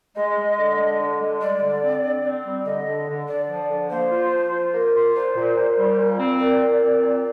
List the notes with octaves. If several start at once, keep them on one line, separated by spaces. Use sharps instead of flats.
G#3 D#5
G#3
D3
G#3
D3
G#3
G3 D5
D3
C4
D3
C4
G3
D3 D#5
D3
D3
D3 D5
F3
D3
A#3 C5
F4
F3
F4
A#3
F4
A#2 C5
A#2
A#2
G3
A#2
C4
A#2 D5
A#2
C4
A#2